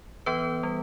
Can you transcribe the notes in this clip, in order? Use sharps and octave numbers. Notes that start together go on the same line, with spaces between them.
E3 B3 B4
G3